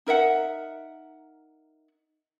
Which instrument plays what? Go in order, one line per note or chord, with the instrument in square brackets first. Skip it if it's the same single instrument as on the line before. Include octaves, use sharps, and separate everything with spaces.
[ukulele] D#4 A#4 E5 F#5